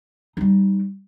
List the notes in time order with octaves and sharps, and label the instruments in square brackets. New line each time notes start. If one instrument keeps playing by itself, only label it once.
[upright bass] G3 D#4